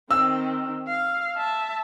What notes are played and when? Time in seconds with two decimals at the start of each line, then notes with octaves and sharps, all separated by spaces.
0.11 D#3 C4 E6
0.88 F5
1.37 E5 A5